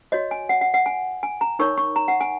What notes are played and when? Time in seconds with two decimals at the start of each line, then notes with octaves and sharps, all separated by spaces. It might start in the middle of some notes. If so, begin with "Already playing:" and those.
0.12 F#4 C#5 D#5
0.31 G#5
0.49 F#5
0.61 F#5
0.74 F#5
0.86 G#5
1.23 G#5
1.41 A#5
1.59 D#4 A#4 C#5 C#6
1.78 C#6
1.96 A#5
2.08 F#5
2.21 G#5